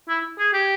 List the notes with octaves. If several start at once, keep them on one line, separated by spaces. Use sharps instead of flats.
E4
G#4
G4